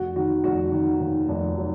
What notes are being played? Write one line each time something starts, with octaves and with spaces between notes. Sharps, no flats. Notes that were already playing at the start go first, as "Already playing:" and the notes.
Already playing: F1 F#4
D#3 F#4
F1 F#4
D#3
D#2
F1
F#3